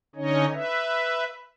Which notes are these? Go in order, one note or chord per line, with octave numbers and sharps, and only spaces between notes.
D3 C#4 D#4 C#5 D#5
B4 E5